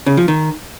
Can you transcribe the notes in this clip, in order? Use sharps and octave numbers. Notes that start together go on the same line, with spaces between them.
C#3
F3
D#3